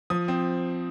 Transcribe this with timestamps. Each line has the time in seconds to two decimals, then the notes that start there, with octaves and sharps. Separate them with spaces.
0.10 F3 D#6
0.28 C4